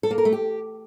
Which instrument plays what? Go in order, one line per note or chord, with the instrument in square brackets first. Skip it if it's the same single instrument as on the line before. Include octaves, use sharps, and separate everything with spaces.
[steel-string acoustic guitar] A4
A#3
A#4
A3
G4